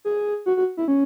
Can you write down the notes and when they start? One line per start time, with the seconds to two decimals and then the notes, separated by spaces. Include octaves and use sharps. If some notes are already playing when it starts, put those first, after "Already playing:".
0.05 G#4
0.46 F#4
0.57 F#4
0.77 E4
0.88 C#4